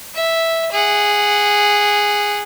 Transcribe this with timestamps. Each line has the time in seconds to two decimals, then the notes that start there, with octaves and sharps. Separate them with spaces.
0.14 E5
0.72 G#4 F#5